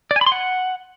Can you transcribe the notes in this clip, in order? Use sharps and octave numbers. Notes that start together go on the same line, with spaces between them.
D5
G#5
B5
C6
F#5